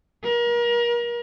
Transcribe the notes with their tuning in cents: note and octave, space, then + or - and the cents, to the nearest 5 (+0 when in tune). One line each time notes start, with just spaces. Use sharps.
A#4 +35